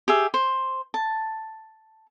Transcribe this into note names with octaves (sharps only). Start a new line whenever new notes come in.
G4 G#4 E5
C5
A5